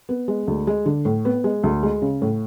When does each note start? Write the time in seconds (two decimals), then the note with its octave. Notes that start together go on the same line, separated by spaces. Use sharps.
0.09 B3
0.28 G#3
0.48 D2
0.67 G#3
0.86 D3
1.05 A2
1.25 B3
1.44 G#3
1.63 D2
1.83 G#3
2.02 C#3
2.22 A2